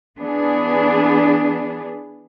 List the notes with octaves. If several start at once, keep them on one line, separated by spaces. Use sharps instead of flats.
E3 B3 D4 G#4